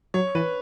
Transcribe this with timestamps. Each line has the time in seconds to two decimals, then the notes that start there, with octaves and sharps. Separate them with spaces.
0.14 F#3 C#5
0.35 E3 B4